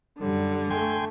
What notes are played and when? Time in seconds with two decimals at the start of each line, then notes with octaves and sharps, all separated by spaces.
0.19 F#2 D3 G3
0.70 A3 G5 G#5 C6